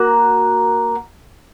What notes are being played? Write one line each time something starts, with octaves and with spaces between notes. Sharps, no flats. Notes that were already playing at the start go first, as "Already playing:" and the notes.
Already playing: A#3 F#4